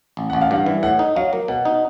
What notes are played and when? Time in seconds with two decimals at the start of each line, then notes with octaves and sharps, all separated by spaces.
0.17 A1
0.30 A1 F#5
0.41 F5
0.51 G2 F#5
0.66 E3
0.83 A2 F#5
0.99 D#4
1.16 F#3 F5
1.33 A#3
1.48 B2 F#5
1.65 D#4